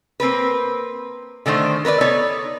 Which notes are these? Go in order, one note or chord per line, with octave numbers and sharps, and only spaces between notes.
A#3 C4 A#4 B4
D3 D#3 A3 C5
A#4 B4 C#5 D5
B3 D#4 A4 C#5 D5